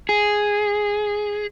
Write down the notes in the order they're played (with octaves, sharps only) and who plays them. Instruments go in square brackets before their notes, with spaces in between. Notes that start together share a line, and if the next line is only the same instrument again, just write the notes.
[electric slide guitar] G#4